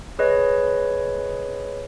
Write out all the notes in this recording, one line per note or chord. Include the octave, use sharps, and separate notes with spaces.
G#4 B4 C#5 D#5